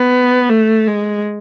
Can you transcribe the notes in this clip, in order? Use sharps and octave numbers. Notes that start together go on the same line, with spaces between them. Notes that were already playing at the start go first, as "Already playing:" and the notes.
Already playing: B3
A3
G#3